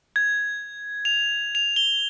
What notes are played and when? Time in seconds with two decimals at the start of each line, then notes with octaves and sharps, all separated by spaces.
0.16 G#6
1.05 F7
1.55 F7
1.76 G7